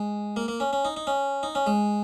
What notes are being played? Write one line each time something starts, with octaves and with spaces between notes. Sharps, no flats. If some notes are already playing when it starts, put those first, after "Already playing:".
Already playing: G#3
A#3
A#3
C#4
C#4
D#4
D#4
C#4
D#4
C#4
G#3